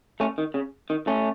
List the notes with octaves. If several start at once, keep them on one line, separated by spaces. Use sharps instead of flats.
A3 C#4
D#3
C#3
D#3
A3 C#4